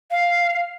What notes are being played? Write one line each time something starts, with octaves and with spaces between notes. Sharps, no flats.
F5